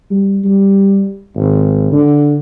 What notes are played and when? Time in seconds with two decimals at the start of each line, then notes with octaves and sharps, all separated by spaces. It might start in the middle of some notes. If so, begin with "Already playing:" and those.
0.11 G3
0.44 G3
1.36 G#1
1.92 D3